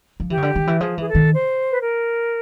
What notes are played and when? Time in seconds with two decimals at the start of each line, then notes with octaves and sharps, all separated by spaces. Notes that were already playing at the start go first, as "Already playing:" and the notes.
0.20 F3
0.30 E3 G4
0.37 C#3
0.42 D3
0.56 D#3
0.67 E3
0.80 F3 G#4
0.98 E3 G#4
1.06 A4
1.15 D#3
1.32 C5
1.71 B4
1.82 A#4